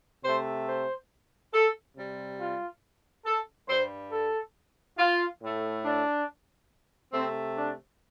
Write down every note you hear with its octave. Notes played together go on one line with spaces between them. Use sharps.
C3 A3 C5
C5
A4
C3 G3
F4
A4
G2 G3 C5
A4
F4
A2 A3
D4
C3 A3 C4
D4